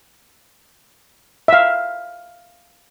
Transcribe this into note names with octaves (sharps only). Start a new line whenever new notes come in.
E5 F5